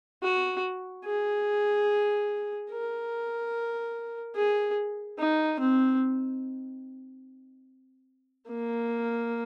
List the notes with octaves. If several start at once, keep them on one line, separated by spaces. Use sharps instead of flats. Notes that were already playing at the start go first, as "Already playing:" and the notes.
F#4
G#4
A#4
G#4
D#4
C4
A#3